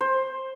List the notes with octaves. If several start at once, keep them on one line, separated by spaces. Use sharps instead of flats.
C5